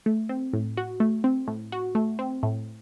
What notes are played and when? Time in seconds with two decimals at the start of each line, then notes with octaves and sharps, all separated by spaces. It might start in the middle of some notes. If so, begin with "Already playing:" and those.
0.06 A3
0.29 C4
0.53 A2
0.77 F#4
1.00 A3
1.24 C4
1.48 A2
1.72 F#4
1.95 A3
2.19 C4
2.43 A2